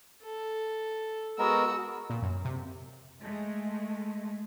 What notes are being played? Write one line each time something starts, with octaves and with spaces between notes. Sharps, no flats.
A4
G#3 B3 F#4 A#4 E6
A#2
F#2
C3
G#3 A3